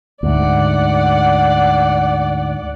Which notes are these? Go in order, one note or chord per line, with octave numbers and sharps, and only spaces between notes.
D2 G#2 D5 F#5